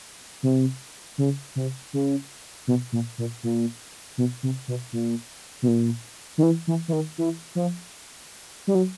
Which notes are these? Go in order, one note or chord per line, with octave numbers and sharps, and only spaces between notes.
C3
C#3
C3
C#3
B2
A#2
A#2
A#2
B2
C3
B2
A#2
B2
A#2
D#3
E3
E3
E3
D#3
E3
F3
G3
F#3